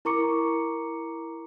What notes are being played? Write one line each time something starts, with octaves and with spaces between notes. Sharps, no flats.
E4 A#4 A#5 C#6 D6 C#7